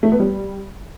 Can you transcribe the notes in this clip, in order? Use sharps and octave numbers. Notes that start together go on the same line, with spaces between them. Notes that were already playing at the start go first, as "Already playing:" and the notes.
A3
B3
G3